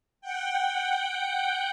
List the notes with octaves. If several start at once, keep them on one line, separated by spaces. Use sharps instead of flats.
F#5 G5